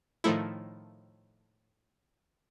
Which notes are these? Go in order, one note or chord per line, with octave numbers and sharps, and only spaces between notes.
A2 D#3 F3 A3 E4